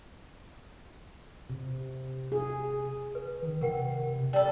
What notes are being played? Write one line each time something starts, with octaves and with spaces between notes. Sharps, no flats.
C3
G#4
B4
D#3
C3 A#4 F#5 G5
G3 A4